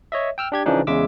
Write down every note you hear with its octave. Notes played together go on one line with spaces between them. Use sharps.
C#5 D#5 E5
G5 E6 F6
D4 G4 G#6
C#3 E3 F3 D4 D#4
E2 C#3 G#3 E5 D6 E6